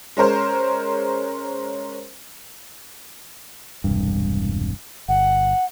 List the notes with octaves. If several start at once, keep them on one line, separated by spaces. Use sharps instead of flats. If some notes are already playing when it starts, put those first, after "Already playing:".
G#3 C#4 A#4 C5
E1 C2 G2
G1 F#5